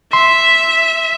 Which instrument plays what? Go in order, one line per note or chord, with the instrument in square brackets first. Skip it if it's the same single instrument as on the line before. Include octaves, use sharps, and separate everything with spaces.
[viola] E5 [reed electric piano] C6